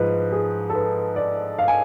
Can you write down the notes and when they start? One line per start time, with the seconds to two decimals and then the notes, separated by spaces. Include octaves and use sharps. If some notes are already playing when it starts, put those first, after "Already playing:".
Already playing: G#2 F3 B4
0.32 G#4
0.70 A4
0.75 B4
1.16 D5
1.59 F5
1.68 G#5